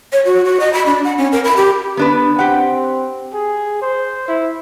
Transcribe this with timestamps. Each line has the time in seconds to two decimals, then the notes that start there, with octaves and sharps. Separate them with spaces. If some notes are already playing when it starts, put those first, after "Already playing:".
0.13 C#5
0.25 F#4
0.45 F#4
0.60 D#5
0.73 B5
0.86 D4
1.04 F#5
1.18 C#4
1.32 A#4
1.44 B5
1.57 G4
1.97 B3 D4 B4
2.39 C4 G4 F#5
3.34 G#4
3.82 C5
4.28 E4